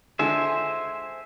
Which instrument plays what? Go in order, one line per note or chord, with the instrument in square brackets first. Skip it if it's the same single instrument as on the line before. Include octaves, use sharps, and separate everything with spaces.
[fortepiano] D3 G#3 [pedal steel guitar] C5 E5 G#5